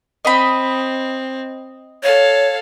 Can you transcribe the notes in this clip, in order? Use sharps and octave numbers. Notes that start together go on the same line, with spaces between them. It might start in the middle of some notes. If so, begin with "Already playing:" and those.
C4 D#5 B5
A4 C#5 F5